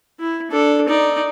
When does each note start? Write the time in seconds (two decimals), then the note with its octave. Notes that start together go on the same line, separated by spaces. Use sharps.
0.20 E4
0.51 D4 A4
0.88 D#4 D5